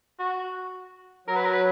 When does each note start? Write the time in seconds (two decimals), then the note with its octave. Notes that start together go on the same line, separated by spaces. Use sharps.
0.19 F#4
1.28 F#3 A#4
1.36 B4
1.45 A#4
1.53 B4